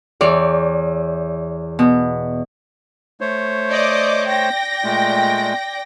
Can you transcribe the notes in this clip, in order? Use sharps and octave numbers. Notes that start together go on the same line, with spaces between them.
E2 C#5 D5 C#6 D6
B2
A3 C5 C#5
D5 D#5 D6
D5 G5 A#6
A#2 G#3 A3